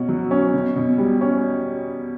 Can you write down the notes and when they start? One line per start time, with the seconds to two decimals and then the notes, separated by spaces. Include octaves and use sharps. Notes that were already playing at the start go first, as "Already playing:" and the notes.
Already playing: B2 C#4 F#4
0.09 F#3
0.31 C#4
0.54 B2
0.76 B2
0.98 G3
1.21 C#4